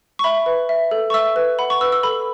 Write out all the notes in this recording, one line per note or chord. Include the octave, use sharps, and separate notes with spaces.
C#6
E5 B5
B4
E5
A4
C#6
E5 E6
B4
F#5 B5
C#6
B4 E6
E6
A4 B5